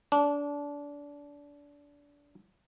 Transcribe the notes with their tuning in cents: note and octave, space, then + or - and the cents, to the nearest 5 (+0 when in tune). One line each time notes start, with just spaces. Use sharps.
D4 -25